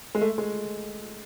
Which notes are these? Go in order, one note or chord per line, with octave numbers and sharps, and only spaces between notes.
G#3
A3
G#3